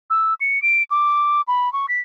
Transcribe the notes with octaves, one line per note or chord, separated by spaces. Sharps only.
E6
C#7
D7
D6
B5
C#6
B6